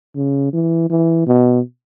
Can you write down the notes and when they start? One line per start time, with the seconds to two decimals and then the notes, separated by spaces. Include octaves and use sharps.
0.16 C#3
0.53 E3
0.90 E3
1.27 B2